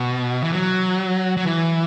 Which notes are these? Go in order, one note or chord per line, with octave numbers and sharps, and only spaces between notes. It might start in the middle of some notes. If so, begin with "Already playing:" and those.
Already playing: B2
E3
F#3
F#3
E3